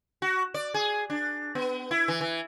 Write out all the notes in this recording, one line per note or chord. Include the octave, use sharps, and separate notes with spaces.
F#4
D5
G#4
D4
B3
E4
E3
E3